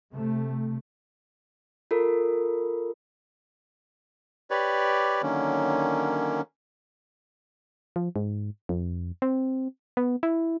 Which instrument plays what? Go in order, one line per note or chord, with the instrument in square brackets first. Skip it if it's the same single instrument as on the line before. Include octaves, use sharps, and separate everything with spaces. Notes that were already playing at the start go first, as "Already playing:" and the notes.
[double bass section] C3 A3
[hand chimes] F4 A4 A#4
[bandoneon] G4 B4 C#5 D5
D3 D#3 F#3 A#3 C#4
[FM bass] F3
G#2
F2
C4
B3
E4